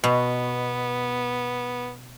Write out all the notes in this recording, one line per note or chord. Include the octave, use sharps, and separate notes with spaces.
B2 B3